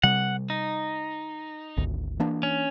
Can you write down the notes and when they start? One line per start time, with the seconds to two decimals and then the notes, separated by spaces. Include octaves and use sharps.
0.03 C3 G3 F#5
0.50 D#4
1.77 G#1 D2
2.20 E3 A#3 D4
2.43 C#4